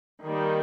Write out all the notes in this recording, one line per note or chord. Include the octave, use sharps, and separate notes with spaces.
D#3 G3 A#3 D#4